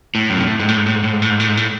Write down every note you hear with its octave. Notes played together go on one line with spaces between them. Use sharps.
A2
F#2
C3
A2
G#2
A2
G#2
A2
G#2
A2
G#2
A2
G#2
A2
G#2
A2